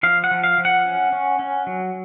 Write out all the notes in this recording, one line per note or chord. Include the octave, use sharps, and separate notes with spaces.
F3 F5
F#5
F3
F5
F3
F#5
C#4
C#4
C#4
F#3